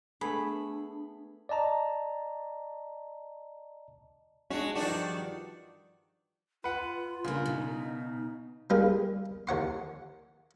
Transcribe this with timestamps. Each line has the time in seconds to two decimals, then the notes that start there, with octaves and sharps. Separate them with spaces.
0.21 A3 B3 D4 G#4 B5
1.49 D5 D#5 A5 A#5
4.50 G#3 C#4 D4 F#4
4.75 G2 D#3 F3 D4 F#4
6.64 F4 B4 F#5
7.24 C#3 A#3 D4
7.46 B2 D#4
8.70 G3 A#3 D#4 G#4 A#4
9.47 D#2 C#5 F#5 C6